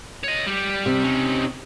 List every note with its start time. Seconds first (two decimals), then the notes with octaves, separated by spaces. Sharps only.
0.24 C#5 D#5
0.47 G3 G4
0.86 C3
1.04 C#4 D#4